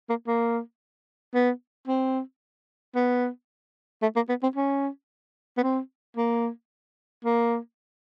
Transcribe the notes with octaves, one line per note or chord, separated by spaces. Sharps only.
A#3
A#3
B3
C4
B3
A3
A#3
B3
C4
C#4
B3
C4
A#3
A#3